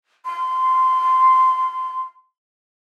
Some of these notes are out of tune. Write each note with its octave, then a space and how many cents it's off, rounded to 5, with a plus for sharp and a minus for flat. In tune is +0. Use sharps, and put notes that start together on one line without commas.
C6 -15